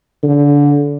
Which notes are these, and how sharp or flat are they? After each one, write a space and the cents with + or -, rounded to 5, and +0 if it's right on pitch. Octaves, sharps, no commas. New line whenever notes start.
D3 -25